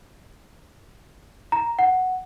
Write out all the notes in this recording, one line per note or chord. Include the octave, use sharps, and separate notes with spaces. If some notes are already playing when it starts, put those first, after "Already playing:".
A#5
F#5